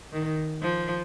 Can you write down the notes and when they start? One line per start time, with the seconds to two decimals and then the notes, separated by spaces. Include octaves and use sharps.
0.13 D#3
0.62 F3